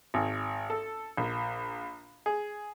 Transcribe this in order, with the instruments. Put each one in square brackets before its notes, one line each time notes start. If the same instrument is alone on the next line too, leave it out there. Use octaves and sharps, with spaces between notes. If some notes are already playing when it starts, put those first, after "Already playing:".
[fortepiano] G#1
A4
A#1
G#4